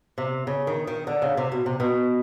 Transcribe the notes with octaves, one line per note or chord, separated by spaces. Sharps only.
C3
C#3
D#3
D#3
D3
C#3
C3
B2
C3
B2